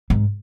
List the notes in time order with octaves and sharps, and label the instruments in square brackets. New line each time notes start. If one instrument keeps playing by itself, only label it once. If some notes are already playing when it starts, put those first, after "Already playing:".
[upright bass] G#2